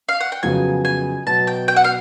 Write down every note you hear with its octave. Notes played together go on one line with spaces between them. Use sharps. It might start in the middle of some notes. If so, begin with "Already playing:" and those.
F5
F#5
G5
F2 C#3 F#3 B3 G#5
G#5
B2 F#3 B3 A5
G5
G5
F#5
F5